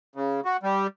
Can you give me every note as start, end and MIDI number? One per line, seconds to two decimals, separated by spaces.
0.16 0.40 49
0.45 0.57 66
0.63 0.87 55